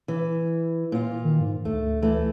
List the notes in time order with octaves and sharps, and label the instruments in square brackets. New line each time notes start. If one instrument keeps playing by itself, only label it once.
[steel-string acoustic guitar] E3
A#2 F4
[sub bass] D#3
G#2
[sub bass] D2 [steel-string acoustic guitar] A3
[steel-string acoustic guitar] E3 A3